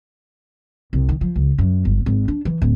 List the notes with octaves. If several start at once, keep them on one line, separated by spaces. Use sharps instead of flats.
C2
D#3
F3
C#2
F#2
G1
G#1
D4
E3
D1